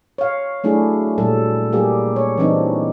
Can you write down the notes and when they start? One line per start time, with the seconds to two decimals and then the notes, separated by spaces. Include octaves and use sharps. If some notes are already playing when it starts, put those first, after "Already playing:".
0.18 C#5 F5
0.64 F#3 A3 D4 E4 G#4
1.18 A#2 F#3 G3 A4
1.72 G3 A#3 G4 G#4
2.16 C#5
2.37 E3 G3 B3 C4 D4 D#4